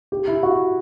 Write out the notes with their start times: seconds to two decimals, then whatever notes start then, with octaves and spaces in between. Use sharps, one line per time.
0.12 G4
0.28 E4
0.43 F#4